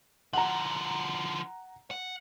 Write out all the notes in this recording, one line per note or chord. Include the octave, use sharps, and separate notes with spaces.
D3 F3 F#5 A#5
F#5